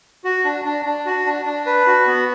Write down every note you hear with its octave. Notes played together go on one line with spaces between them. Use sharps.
F#4
D4
D4
D4
F#4
D4
D4
B4
F#4
B3